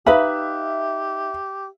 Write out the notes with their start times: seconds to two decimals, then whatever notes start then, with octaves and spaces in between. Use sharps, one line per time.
0.06 D#4 G4 B4 E5 F5 B5